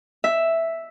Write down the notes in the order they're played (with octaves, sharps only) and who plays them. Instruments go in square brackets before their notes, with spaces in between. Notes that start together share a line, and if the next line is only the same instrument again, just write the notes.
[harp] E5